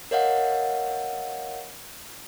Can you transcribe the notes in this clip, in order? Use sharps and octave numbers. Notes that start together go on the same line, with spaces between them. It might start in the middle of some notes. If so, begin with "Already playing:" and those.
A#4 C#5 D#5 F5 F#5